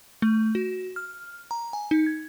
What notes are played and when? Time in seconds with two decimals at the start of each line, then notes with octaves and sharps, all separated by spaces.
0.22 A3
0.55 F#4
0.96 F6
1.51 A#5
1.73 G#5
1.91 D#4
2.06 G#6